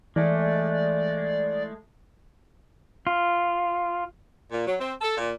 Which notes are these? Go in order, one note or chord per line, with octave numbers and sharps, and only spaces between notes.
E3 G#3 A3 D5
F4
A#2
F#3
C4
A4
A#2